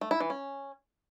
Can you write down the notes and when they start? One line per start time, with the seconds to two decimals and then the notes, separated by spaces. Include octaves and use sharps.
0.01 A3
0.11 E4
0.20 E3
0.30 C#4